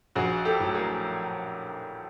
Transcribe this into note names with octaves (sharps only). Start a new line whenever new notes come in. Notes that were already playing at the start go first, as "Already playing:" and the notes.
A#1 F#4 G#4
G4 A4
A2 F#3
G#4 A#4